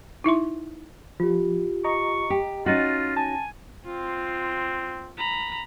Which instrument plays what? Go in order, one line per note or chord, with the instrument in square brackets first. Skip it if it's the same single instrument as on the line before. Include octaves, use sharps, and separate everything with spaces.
[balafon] D#4 E4 E5 C6
[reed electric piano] F3 [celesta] F4 G4
[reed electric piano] D#5 A#5 [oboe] C#6
[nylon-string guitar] G4
[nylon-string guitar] C#4 D#4 F#4 [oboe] F4 [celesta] A6 A#6 D#7
[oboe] G#5 [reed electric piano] A5
[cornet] C4 [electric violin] F4
[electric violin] A#5 B5